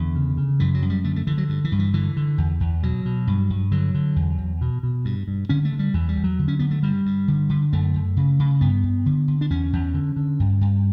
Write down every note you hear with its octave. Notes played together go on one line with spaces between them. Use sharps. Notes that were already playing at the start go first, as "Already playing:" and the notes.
Already playing: E2 D3
C#3
C#3
F#2 E3
F#3
F#2
G3
D3 A3
A3
D3 E3
F#3
G2
E3
G2
E3
D3 E3
D3
E2
E2
B2 F#3
B2
G2
G2
D3 F#3
D3
E2
E2
B2
B2
G2
G2
D3 C#4
A3
D3
G3
E2 E3
G3
E2
F#3
D3
C#4
D3 B3
A3
G2 G3
G2
D3
D3
F#2 A3
F#2
C#3
C#3
G2 B3
G2
D3
D3
D4
E2 C#4
E2
D3
D3
G2
G2